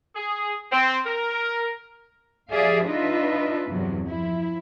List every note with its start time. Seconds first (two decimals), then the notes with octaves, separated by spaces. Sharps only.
0.15 G#4
0.71 C4
1.06 A#4
2.50 F3 G4 G#4 D5 E5 F5
2.85 D4 D#4 F4 B4 D#5 E5
3.69 E2 G2 C3 F#3
4.08 F3 E4